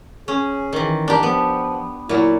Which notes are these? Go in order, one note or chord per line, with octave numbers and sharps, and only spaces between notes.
C#4 G#4
D#3 E3
D4 G4 A#4
F3 B3
A#2 F#3 E4